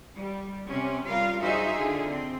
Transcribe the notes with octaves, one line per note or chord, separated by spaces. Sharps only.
G3
C3 C#4
G3 F4 A#4 F5
G2 D#4 F#4 G#4 C5 E5
D3 F4 G#4
C4